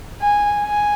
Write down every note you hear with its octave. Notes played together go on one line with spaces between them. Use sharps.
G#5
G#5